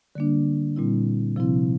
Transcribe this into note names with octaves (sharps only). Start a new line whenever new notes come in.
D3 G3 A#3 D4
A#2 G3 C4 E4
C3 F3 C4 E4